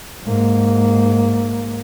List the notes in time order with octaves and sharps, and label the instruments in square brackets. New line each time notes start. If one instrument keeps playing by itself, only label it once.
[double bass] G#2 A#3